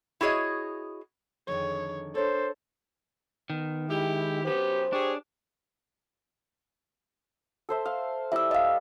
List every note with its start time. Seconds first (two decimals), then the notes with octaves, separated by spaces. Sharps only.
0.21 E4 F#4 G#4 C#5 D#5
1.48 F2 D3 D#3 G#4 C#5
2.15 D4 A4 A#4 C5 C#5
3.50 D#3 B3
3.89 G#3 E4 G4
4.45 F#2 B3 G4 C5
4.93 D4 G4 G#4 C#5
7.69 A4 C5 E5
7.85 F5
8.32 G3 E4 E5 G5 E6
8.51 D#5 F5